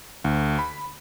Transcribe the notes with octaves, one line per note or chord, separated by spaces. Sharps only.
D2
B5